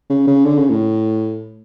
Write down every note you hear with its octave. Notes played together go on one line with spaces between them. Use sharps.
C#3
C#3
D3
C#3
A2